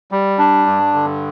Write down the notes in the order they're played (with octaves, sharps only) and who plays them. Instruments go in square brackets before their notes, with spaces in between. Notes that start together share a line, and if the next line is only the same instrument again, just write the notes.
[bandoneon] G3
D4
G2
D3